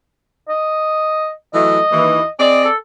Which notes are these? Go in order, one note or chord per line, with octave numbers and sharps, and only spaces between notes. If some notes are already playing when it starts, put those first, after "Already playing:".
D#5
E3 F#3 A3 D#5
D#2 E3
C4 G#4 D5 D#5
A4